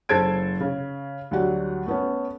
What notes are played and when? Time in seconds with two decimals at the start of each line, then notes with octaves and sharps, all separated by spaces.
0.09 F#1 G#4 A4 C5 G#6 D7
0.60 C#3
1.31 D2 F#3 G3 F#5
1.86 A3 B3 C#4